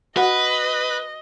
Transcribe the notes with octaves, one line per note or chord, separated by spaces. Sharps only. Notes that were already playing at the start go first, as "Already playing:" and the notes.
F#4 B4 D#5 F#5